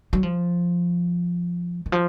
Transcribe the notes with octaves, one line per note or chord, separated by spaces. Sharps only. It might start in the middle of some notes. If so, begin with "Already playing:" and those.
F#3
F3
D#3
F3